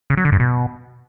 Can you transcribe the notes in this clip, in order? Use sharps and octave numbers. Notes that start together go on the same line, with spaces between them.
C#3
F#3
D3
G2
B2